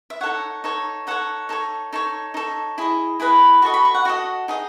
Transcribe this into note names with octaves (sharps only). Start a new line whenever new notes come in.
E5
D#4 A4 C#5 F#5
D#4 A4 C#5
D#4 A4 C#5 F#5
D#4 A4 C#5
D#4 A4 C#5
D#4 A4 C#5
E4 G#4 D#5
E4 G#4 B4 D#5
F#4 A4 D#5 C#6
B5
C#6
F#5
F#4 A4 D#5 F#5
D#4 G#4 D#5